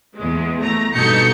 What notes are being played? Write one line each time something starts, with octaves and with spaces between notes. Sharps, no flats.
E2 G#3
A3 A#5
G2 B2 D#4 A4 G6 C#7